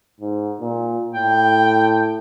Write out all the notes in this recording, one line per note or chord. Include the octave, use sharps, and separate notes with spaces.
G#2
A#2
A2 G5